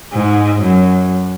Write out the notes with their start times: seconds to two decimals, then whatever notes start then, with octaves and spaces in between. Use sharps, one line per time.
0.13 G#2
0.63 F#2